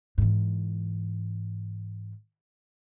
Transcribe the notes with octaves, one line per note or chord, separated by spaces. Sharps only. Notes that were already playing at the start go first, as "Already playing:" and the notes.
G#2 E3